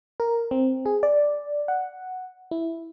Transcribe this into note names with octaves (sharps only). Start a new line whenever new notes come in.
A#4
C4
G#4
D5
F#5
E4